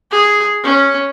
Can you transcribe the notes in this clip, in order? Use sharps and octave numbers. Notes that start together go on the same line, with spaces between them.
G#4
C#4